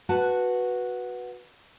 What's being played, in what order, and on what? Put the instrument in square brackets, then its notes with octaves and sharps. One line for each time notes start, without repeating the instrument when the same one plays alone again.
[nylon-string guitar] F#4 B4 F#5 A5